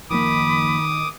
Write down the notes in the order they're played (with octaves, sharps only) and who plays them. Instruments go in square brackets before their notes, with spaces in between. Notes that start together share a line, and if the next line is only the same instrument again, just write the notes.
[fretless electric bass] F#1 F3 A#3 [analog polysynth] D#3 [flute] B5 [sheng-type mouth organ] D6 D#6